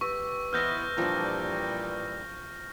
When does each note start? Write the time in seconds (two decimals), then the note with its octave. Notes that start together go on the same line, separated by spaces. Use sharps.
0.01 G4 B4 C#6 E6
0.53 E3 B3 C5 D#5 E5 F6 G6 A#6
0.98 A#2 E3 F3 G3 D4